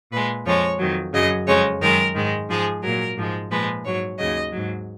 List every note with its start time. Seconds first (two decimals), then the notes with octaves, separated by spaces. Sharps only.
0.12 A#2 G#3 B4
0.46 F2 F3 G#3 C#5
0.79 F2 D#3 F#3
1.14 F#2 C#3 F#3 D#5
1.47 F2 C#3 G#3 C#5
1.81 F#2 D#3 G#3 A#4
2.15 G#2 D#3 G#3
2.49 G#2 F3 G#3 G#4
2.83 A#2 F#3 A#4
3.17 G#2 F3 G#3
3.51 A#2 F3 G#3 B4
3.84 G#2 F#3 C#5
4.19 D#2 C#3 F#3 D#5
4.53 G#2 F#3